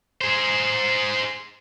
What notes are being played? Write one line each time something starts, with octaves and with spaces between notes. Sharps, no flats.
G#4 C5